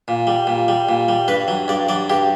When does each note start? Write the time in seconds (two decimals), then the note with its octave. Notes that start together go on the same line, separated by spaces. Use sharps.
0.08 A#2
0.27 G3
0.47 A#2
0.68 G3
0.89 A#2
1.08 G3
1.28 G2 B4
1.48 F#3
1.68 G2 D5
1.89 F#3 D5
2.10 G2 G4